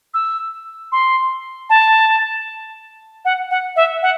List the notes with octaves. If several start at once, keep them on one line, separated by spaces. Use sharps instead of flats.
E6
C6
A5
F#5
F#5
E5
F#5